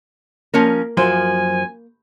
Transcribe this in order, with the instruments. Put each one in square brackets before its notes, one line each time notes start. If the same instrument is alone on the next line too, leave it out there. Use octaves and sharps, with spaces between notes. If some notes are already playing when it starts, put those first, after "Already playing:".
[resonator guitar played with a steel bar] F3 C#4 A#4 [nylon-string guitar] A#3
[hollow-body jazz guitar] F#2 F3 C6 [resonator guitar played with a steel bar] C5 [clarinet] G#5